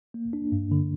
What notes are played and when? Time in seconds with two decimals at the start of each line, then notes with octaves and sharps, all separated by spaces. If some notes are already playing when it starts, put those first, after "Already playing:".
0.14 A#3
0.33 D4
0.52 G2
0.72 D3